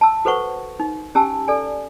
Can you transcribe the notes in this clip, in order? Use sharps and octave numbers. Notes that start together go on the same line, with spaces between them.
A5 E6
F#4 A4 B4 C5 F#5 C#6
D#4
C#4 G4 G#5 A5 E6
A4 D5 G#5